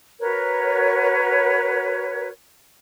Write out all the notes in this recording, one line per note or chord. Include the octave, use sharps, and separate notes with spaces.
F#4 A#4 B4 C#5